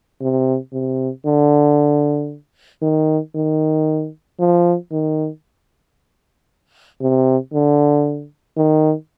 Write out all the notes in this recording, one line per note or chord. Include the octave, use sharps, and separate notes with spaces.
C3
C3
D3
D#3
D#3
F3
D#3
C3
D3
D#3